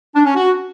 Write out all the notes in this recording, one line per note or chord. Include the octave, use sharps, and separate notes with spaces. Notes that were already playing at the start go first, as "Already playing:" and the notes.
D4
C#4
F#4